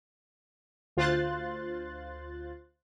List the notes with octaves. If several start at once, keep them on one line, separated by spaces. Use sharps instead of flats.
D2 F4 C5 C6 F#6 A6